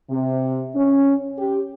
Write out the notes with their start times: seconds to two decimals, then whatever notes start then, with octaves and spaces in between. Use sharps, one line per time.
0.11 C3
0.75 C#4
1.39 G4